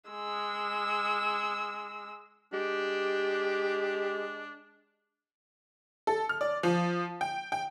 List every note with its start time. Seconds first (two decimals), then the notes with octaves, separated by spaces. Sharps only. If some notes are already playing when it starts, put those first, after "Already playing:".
0.10 G#3 E6
2.53 G#3 D4 G4
6.07 A4
6.29 F6
6.41 D5
6.63 F3
7.21 G5
7.52 G5